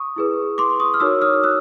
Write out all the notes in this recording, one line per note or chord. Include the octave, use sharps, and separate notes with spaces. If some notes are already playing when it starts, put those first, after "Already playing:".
Already playing: C#6 D#6
E4 G#4 B4
C6 D6
C#6 D#6
F6
D#4 F#4 A#4 C#5 D6 E6
D#6 F6
E6 F#6